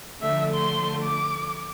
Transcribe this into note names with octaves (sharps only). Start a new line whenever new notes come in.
D3 F3 A3 E5
C6
D6